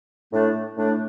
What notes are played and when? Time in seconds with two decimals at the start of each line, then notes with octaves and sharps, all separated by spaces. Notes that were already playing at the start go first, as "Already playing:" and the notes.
0.33 A2 A3 D4
0.77 A2 A3 D4